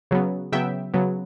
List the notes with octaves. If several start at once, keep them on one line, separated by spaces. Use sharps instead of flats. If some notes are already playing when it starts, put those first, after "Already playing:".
C#3 F#3 B3
C#3 F#3 B3 E5 G5
C#3 F#3 B3